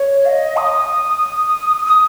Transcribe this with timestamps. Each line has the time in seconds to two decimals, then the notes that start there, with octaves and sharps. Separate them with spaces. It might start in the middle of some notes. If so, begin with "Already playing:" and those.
Already playing: C#5
0.25 F5
0.29 D#5
0.57 D#6
1.86 D#6